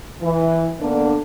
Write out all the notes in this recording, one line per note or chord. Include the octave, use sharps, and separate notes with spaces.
E3
D3 A#3 B3 D4